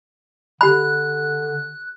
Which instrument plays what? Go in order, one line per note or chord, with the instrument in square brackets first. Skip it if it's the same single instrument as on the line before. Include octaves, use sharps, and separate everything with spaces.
[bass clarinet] D3 [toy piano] G4 B5 [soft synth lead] F#6